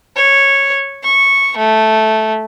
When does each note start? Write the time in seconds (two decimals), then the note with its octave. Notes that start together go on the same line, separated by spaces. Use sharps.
0.16 C#5
1.03 C#6
1.57 A3